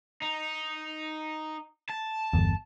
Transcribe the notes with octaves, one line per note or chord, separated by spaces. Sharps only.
D#4
A5
G1 E2